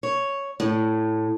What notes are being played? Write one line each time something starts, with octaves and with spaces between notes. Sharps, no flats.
C#5
A2